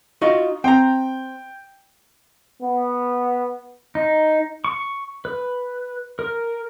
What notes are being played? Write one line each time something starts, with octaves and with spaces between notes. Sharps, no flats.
D#4 F4 F#4
C4 G5 A#5
B3
D#4
C#6
B4
A#4